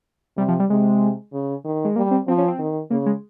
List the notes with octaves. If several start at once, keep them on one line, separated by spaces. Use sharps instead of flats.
C3 G3
F3
G3
C3 G#3
C#3
D#3
G#3
G3 A#3
C4
F3 C4
C#4
C4
D#3
C#3 A#3
G#3